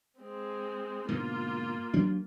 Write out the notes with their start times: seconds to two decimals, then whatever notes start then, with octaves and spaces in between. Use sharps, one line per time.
0.20 G#3 C4
1.09 G#2 B2 D3 A#3 F4
1.94 D2 F#3 D4